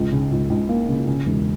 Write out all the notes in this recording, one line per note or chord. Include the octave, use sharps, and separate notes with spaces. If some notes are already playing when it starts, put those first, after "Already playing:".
Already playing: C#2
C#3
C#2
C#2
A#3
C#3
C#3
E1